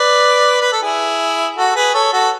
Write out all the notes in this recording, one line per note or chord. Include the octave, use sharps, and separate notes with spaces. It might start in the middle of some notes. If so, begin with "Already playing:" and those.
Already playing: B4 D5
B4
A4
E4 G#4
F#4 A4
G#4 B4
A4 C#5
F#4 A4